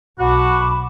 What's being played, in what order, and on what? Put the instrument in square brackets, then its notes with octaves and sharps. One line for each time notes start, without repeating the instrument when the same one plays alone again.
[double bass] B1 [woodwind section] F#4 [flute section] A5 B5 D6